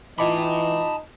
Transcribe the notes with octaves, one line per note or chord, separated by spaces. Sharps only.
E3 D#4 F4 D#5 A5 B5 D6